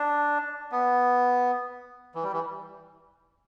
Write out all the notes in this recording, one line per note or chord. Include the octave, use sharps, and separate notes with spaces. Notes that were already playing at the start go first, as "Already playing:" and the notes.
Already playing: D4
B3
E3
G3
E3